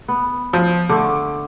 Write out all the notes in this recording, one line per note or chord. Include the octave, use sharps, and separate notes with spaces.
B3
F3
D3 A3 D6